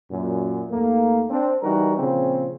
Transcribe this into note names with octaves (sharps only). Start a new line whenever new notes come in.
F#2 A#2
D#2 A3 A#3
C4 D4
E3 G3 D#4 F#4 A#4
A#2 C#3 F3 C4